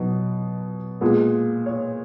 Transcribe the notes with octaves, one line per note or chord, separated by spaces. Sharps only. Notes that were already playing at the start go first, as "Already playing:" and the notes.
Already playing: B2 F#3 B3 D#4
A#2 G#3 B3
C#5